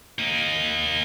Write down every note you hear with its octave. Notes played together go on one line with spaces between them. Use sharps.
A#3 D#4